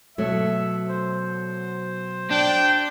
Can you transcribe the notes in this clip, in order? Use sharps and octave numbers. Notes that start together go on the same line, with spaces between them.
B2 F#3 A3 E5
C5
D4 G5